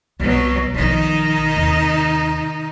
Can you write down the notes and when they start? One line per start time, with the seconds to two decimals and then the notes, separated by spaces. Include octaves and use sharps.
0.20 C2 B2 F#3
0.74 B1 D#3 F3 D#4
1.56 D#2 C3